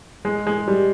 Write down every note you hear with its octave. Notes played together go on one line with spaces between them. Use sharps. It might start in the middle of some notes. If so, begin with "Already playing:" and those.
G#3
G#3
G3